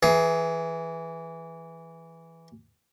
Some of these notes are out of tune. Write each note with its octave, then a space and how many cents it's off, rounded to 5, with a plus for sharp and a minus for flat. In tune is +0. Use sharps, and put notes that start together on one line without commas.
E3 +0 G#4 +15